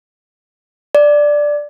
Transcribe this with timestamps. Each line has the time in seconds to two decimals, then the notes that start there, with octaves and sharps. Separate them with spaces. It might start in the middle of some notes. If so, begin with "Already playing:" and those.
0.95 D5